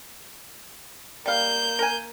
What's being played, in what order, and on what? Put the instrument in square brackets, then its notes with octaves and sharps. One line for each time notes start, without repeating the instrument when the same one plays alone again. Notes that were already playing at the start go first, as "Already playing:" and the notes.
[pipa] G3 F5 [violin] A#3 G6
[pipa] A#4 G#5